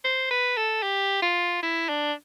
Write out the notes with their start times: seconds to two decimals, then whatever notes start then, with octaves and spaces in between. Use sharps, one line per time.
0.04 C5
0.30 B4
0.57 A4
0.83 G4
1.22 F4
1.63 E4
1.89 D4